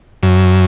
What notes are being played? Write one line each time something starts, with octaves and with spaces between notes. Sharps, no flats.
F#2